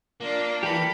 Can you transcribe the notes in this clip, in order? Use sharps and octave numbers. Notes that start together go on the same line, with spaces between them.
A#3 D4 F4
E3 G4 A4 B5